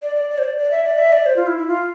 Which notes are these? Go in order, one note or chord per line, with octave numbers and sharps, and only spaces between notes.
D5
D5
D5
C5
D5
D5
E5
D5
E5
D5
C5
F4
E4
E4
F4